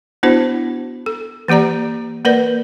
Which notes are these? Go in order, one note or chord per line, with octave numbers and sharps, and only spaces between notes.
B3 D4 E4 F#4 C5
A4
E3 A#3 G4 D5 A#5
A#3 A#4 B4 D5